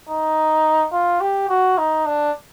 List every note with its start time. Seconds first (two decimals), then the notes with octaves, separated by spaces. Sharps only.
0.10 D#4
0.93 F4
1.21 G4
1.49 F#4
1.78 D#4
2.06 D4